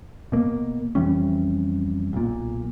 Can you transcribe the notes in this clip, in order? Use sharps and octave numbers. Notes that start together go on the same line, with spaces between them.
B2 A#3
F2 E3 G3 C#4
B1 A#2